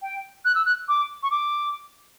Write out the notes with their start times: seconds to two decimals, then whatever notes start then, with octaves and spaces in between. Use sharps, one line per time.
0.02 G5
0.45 F#6
0.55 E6
0.65 F#6
0.88 D6
1.23 C#6
1.31 D6